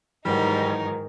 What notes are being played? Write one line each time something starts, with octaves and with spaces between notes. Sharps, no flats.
G#2 D#3 E3 F#3 G3 D#4 A#4